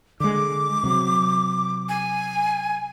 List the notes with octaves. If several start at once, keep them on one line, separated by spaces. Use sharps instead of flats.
D3 G#3 D6
C3 F#3
G#5